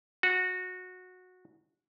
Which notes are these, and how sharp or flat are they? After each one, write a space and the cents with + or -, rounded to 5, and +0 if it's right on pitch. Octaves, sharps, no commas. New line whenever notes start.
F#4 -15